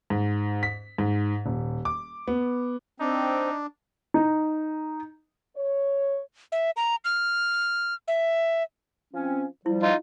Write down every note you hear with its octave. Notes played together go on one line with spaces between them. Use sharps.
G#2
B6
G#2
D#1
D6
B3
C4 D4 D#4
D#4
C#5
E5
A#5
F6
E5
F3 C4 C#4
F3 G3 E4
D#4 F4